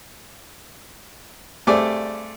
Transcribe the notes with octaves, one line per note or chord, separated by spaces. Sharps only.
G2 G3 A3 C4 G#4 D5